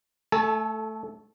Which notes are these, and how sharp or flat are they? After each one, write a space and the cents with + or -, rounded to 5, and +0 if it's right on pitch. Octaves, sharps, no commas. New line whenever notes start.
A3 +0 A4 -10 G#5 +45